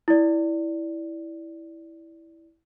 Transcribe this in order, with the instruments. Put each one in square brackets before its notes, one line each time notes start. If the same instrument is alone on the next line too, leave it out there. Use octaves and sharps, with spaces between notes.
[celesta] E4 D5